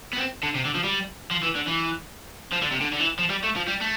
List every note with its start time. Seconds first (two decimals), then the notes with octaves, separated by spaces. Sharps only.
0.13 B3
0.18 C4
0.43 D3
0.55 C3
0.65 D3
0.75 F3
0.84 G3
1.31 F3
1.43 E3
1.56 D3
1.68 E3
2.52 F3
2.62 D3
2.71 C3
2.81 D3
2.93 D3
3.00 E3
3.19 F3
3.30 G3
3.44 A3
3.56 F3
3.67 G3
3.81 A3